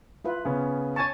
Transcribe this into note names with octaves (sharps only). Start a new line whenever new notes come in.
E4 F4 B4
C#3 B3 C#4
C#5 G#5 A5 C#6 A6